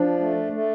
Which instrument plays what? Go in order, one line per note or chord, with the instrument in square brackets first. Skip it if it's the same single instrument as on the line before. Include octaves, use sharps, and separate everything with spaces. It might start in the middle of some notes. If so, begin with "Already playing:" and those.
Already playing: [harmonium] F3 [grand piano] D4
[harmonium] A3
A3